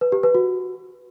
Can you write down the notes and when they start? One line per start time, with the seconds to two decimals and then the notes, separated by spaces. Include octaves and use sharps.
0.01 B4
0.12 G4
0.23 B4
0.34 F#4